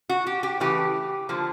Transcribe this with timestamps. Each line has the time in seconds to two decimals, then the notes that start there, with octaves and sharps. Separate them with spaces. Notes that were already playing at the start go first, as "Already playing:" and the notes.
0.09 F#4
0.27 G4
0.43 G4
0.60 C#3 E3 A3 G4
1.29 D3 F3 A#3